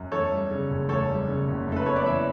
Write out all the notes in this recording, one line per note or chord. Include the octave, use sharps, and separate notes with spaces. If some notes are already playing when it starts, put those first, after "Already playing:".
Already playing: F#2
E2 A4 C#5
G3
C#3
F#1
E2 A4 C#5
G3
C#3
F#1
F#2 A4
B4
B3 A4 C#5
B4 D5
E3 C#5 E5